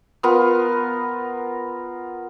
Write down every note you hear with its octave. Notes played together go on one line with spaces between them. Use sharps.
B3 F4 A#4